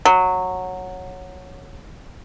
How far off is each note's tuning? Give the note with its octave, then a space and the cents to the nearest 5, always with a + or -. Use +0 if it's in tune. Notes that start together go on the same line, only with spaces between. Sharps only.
F#3 -10